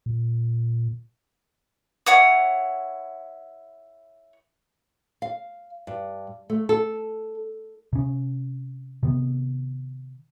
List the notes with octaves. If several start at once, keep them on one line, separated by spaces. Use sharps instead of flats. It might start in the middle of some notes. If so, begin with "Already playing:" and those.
A#2
E4 C#5 F#5 D#6
F5
G2
A3
A4
C3 C#4
C3 D#3 B3